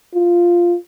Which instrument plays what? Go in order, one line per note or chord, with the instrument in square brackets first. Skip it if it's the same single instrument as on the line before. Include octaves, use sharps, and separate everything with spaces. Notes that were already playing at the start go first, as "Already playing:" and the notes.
[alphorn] F4